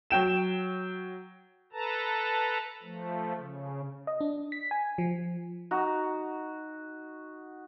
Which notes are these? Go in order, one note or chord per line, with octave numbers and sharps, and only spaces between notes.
F#3 G5 E7
A4 B4 A5 A#5
F3 A3
C#3
D#5
D4
B6
G#5
F3
D#4 F#4